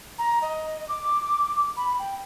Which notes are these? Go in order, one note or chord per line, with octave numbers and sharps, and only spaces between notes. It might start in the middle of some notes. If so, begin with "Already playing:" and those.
A#5
D#5
D6
B5
G5